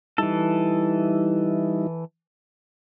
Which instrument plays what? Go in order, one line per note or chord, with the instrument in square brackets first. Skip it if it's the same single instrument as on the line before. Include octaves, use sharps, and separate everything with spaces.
[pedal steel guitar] E3 A4 [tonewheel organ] G3 D#4 E4